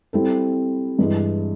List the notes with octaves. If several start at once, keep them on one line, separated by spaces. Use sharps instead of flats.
G3 C4 E4 A4
G2 E3 G#3